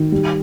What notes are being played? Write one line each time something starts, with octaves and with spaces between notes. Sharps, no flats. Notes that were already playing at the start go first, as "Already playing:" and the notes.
Already playing: D#3
G3